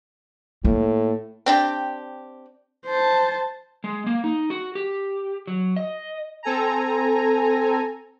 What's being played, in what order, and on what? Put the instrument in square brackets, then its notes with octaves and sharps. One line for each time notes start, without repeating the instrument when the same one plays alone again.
[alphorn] A2 [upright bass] A#3
[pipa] C4 D4 G4
[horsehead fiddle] C5 A5
[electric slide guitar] G#3
A#3
D#4
F#4
G4
F#3
D#5
[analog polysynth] C4 A4 G#5 A#5